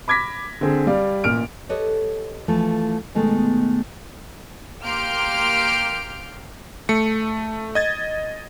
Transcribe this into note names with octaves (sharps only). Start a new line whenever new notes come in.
B5 D6 G#6 A#6 B6
D3 C4 G#4
G3 D5 F5
A1 A#2 F6 D7
G4 A4 B4 C#5 D#5
E3 F3 A3
B2 D#3 G#3 A3
A#3 G4 C6 F6 G6 D7
A3 C#7
D#5 G#6 A6